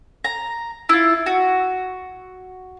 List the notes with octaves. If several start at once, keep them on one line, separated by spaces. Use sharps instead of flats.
A#5
E4 F4
F#4